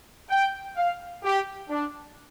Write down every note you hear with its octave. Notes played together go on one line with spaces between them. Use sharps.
G5
F5
G4
D4